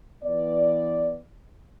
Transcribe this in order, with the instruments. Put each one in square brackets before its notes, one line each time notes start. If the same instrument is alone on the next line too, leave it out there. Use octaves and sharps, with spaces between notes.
[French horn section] E3 B3 D5